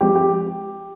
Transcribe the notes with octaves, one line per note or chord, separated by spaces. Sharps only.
F3 G#3 C4 G4
G4